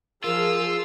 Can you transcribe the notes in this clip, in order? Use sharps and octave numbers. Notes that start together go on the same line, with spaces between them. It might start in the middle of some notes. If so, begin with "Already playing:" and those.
F3 F4 G#4 A#4 E6